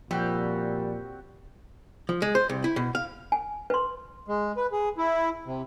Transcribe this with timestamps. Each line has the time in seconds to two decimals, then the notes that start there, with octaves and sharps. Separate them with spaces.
0.11 A#2 F3 G3 C4 F#4 G5
2.09 F3
2.22 G#3
2.35 C5
2.49 C2
2.64 E4
2.76 B2
2.95 F5
3.32 G#5
3.70 B4 C6
4.28 G#3
4.57 B4
4.72 G#4
4.98 E4
5.45 C3